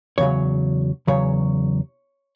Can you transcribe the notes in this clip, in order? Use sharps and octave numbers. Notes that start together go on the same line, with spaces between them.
E2 C#3 F#3 C#5
E2 C#3 F#3 C#5